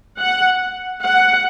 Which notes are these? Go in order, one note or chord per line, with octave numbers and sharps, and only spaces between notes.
F#5
F#5